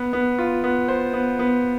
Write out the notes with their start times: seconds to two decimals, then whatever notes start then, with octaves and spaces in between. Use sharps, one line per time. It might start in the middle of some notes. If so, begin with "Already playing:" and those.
Already playing: B3
0.13 B3
0.39 F4
0.64 B3
0.88 C5
1.14 B3
1.39 B3